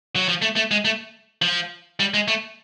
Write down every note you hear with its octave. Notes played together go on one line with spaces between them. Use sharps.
F#3
F3
A3
A3
G#3
A3
F3
G3
G#3
A3